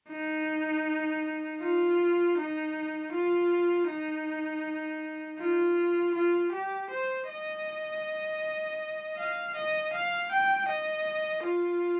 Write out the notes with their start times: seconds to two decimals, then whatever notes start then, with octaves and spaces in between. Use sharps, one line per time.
0.10 D#4
1.61 F4
2.37 D#4
3.12 F4
3.88 D#4
5.39 F4
6.14 F4
6.53 G4
6.91 C5
7.29 D#5
9.17 F5
9.55 D#5
9.93 F5
10.31 G5
10.68 D#5
11.43 F4